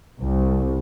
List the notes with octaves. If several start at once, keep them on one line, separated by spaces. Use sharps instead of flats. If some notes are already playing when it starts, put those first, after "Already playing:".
C2